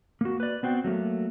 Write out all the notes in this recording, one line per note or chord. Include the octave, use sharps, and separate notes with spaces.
A#3 F#4
B4 D5
B3 C4 F#4 G5
F#3 A3 A#3